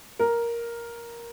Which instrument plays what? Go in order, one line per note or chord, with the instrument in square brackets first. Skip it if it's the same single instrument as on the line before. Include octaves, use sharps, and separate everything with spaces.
[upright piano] A#4